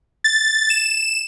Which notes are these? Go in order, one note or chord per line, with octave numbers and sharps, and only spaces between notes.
A6
E7